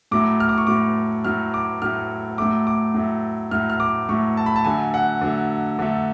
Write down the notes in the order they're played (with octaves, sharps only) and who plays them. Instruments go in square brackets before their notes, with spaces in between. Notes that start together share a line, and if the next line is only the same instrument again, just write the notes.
[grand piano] A2 F#3 A3 D6
F6
D6
C#6
A2 F#3 A3 D6
A2 F#3 A3 F6
D6
A2 F#3 A3 F6
A2 F#3 A3 D6
D6
A2 F#3 A3
A2 F#3 A3 F6
F6
D6
A2 F#3 A3 C#6
A5
B5
A5
D3 F#3 A3 G#5
F#5
D3 F#3 A3
D3 F#3 A3